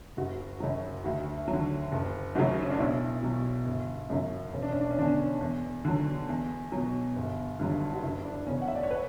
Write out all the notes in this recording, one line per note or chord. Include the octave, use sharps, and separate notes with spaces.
F#1 F#4
F#2 C#3 F#3
D2 F#4
F#3
D3
F#1
F#2 C#3 F#3 F#4
C#4
D4
B1 E4
B2 F#3
G1
F#2 C#3 F#3
E1 C#4
D4
C#4
D4
C#4
E2 D3 D4
C#4
E2
D3 F#3
E2
B2 F#3
G1
G2 D3 F#3
F#4
F#1 E4
D4
E2 C#3 C#4
F#5
E5
D5
C#5
B4